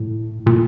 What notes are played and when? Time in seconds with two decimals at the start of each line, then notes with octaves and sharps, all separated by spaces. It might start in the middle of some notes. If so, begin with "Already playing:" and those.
Already playing: A2
0.46 A#2